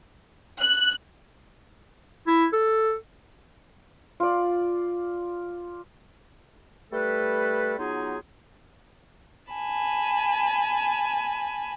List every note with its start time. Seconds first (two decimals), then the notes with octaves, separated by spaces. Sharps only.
0.60 F#6
2.27 E4
2.53 A4
4.20 F4 D5
6.91 G3 A3 A4 B4
7.77 F#3 B3 D#4 F4 G#4
9.53 G#5 A5 B5